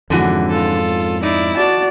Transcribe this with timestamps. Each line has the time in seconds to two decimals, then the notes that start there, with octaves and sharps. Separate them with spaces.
0.10 F2 G#2 D3 E3 F#4
0.49 F4 A4
1.23 D#4 E4 D5
1.57 F#4 D5 A5